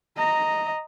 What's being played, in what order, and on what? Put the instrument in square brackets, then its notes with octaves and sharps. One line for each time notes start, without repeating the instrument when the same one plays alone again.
[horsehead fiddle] D#5 A#5